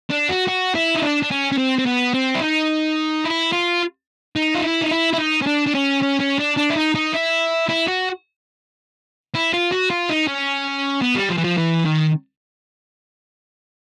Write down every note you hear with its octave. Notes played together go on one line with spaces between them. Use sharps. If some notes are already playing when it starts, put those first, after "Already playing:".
D4
F#4
F#4
E4
D#4
D4
D4
C#4
C#4
C4
C4
B3
C4
E4
D#4
E4
F4
D#4
F4
E4
D#4
E4
E4
D#4
C#4
D4
D4
C#4
C#4
C#4
D4
D4
E4
D#4
D#4
E4
E4
F#4
E4
F4
F#4
F4
D#4
C#4
B3
G3
F3
E3
F3
E3
D#3